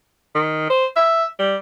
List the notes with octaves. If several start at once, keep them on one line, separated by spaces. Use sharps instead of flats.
D#3
C5
E5
G3